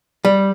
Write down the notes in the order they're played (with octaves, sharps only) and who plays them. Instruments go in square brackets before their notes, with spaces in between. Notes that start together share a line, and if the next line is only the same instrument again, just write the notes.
[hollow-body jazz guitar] G3